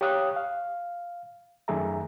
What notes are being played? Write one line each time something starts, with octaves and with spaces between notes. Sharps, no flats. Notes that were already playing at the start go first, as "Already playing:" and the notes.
G4 C#5 F5 D#6 F#6
F5
F#2 D#3 A3 G#4 E5 A#5